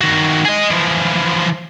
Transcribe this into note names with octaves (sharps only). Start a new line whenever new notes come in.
D#3 F#4
G#4 D#5
E3 F3